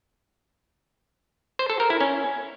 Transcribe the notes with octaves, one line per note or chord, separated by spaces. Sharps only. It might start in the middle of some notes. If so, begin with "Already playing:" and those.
C5
A4
A#4
E4
C#4